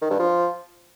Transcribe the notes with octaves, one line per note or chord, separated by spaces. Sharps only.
D#3
G2
F3